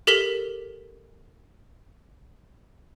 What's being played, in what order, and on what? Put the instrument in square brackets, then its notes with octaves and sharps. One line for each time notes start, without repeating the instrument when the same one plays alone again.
[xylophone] G4 A4 A#4 B6 E7 G7